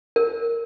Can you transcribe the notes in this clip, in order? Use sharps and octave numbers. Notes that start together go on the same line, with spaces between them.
A#4